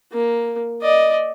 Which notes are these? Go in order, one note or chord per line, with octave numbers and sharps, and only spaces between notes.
A#3
D5 D#5